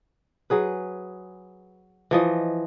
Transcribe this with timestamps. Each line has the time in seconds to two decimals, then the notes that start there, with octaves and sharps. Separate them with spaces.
0.50 F#3 G#4 B4
2.11 E3 F3 D#5